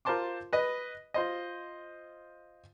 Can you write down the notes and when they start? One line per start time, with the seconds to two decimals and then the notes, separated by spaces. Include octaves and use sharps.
0.05 F4 A#4 C5 A5 C6 D6
0.53 B4 D#5
1.14 F4 C5 D#5